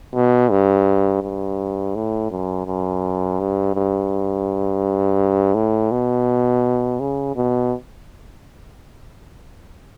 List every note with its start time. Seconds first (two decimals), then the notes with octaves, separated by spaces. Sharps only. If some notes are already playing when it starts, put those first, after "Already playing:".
0.15 B2
0.51 G2
1.23 G2
1.95 A2
2.31 F#2
2.67 F#2
3.40 G2
3.75 G2
5.55 A2
5.92 B2
7.00 C#3
7.36 B2